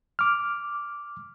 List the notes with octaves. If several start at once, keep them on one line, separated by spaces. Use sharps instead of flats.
D6 F6